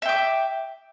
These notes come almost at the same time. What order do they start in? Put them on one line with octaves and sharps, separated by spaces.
E5 G5 D6